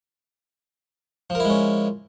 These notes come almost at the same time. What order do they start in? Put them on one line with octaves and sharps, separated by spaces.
F3 A#4 E4 G#3 C#4